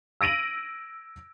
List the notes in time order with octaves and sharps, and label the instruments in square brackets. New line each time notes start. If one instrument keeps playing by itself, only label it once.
[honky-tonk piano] E6 A#6 D7 D#7 F#7